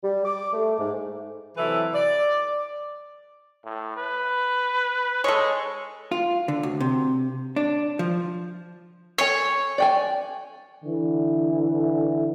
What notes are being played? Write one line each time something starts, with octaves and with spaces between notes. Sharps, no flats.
G3
D6
A3
G#2
C3 E3 F#3 E4 A4 B4
D5
A2
B4
G#3 A4 C#5
F4
D3
D2
C3
D4
F3
A4 C#5 G#5
D5 G5 G#5
D3 E3